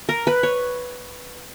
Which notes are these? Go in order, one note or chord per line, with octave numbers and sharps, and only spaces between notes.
A#4
B4
C#5